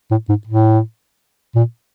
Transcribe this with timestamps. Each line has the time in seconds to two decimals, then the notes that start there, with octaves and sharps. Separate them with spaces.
0.11 A2
0.29 G#2
0.47 A2
1.55 A#2